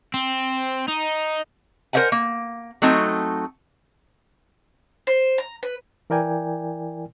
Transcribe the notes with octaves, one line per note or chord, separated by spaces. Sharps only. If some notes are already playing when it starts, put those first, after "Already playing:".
C4
D#4
A#4 C5 C#5 E5 F#5 G#5
A#3
F#3 A3 C4 D#4
C5
A#5
B4
E3 E4 A#4 D5 G5 G#5